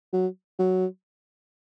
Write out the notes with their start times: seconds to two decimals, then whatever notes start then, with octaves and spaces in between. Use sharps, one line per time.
0.13 F#3
0.59 F#3